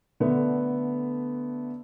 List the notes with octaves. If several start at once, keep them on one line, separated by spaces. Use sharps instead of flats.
D3 A3 B3